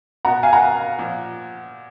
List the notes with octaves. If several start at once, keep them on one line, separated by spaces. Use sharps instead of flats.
B2 F#5 A#5
F5 G#5
F#5 A#5
A#2 F3